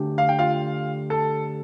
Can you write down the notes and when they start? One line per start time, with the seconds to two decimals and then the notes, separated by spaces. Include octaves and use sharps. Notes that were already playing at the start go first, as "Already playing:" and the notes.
Already playing: D3 A3 D4 G4
0.18 F5
0.29 G5
0.39 F4 F5
1.10 A4